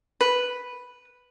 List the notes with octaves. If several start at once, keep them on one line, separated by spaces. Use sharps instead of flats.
B4